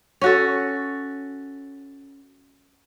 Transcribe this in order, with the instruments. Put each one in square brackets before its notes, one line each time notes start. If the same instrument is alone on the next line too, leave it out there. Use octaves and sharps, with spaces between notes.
[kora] C#4 F#4 A4